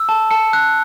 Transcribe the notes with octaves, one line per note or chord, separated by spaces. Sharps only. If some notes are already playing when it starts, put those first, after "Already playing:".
Already playing: E6
A5
A5 C#7
F#6